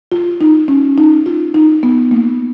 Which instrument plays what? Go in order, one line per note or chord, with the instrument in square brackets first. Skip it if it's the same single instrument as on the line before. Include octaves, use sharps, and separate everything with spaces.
[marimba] F4
D#4
C#4
D#4
F4
D#4
B3
A#3